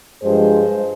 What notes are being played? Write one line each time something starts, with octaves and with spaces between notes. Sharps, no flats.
G2 F3 G#3 G#4 C5